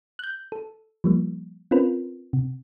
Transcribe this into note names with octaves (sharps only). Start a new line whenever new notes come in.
F#6 G6
A4
F3 G3 A#3
C4 C#4 F4 A#4 B4
C3